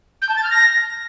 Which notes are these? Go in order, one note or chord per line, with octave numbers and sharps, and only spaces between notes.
G6
A5
A6
F6
A#6